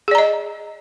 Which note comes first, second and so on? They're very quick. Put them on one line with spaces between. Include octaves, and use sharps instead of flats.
G#4 D5 A#5 D#5